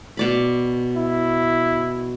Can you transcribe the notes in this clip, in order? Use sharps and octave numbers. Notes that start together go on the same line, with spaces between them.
B2 D5 B5
E4